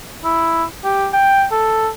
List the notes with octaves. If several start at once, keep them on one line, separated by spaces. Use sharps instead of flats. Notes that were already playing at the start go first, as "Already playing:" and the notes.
E4
G4
G5
A4